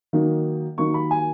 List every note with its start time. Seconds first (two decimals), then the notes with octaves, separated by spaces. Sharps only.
0.13 D#3 F#3 A#3 D#4
0.78 D#3 F#3 A#3 D#4 C#6
0.94 B5
1.11 G#5